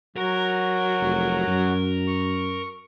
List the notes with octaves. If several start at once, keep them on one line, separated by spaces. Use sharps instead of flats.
F#3 F#4 A#4 A#5
F1
F#2
C#6